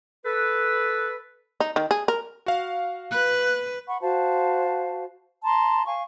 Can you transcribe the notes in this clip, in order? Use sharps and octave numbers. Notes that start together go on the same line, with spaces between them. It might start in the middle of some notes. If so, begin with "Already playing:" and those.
A4 B4
D#4
D#3
G#4
A#4
F#4 F5
B4 F#6
F#5 B5 C#6
F#4 C5 F5 A5
A5 A#5 C6
F5 G#5 C#6